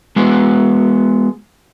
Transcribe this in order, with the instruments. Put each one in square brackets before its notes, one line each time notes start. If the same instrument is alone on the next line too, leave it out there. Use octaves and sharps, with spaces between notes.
[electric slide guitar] G#3 B3 F#4